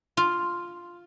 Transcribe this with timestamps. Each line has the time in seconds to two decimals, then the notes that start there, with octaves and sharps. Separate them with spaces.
0.17 F4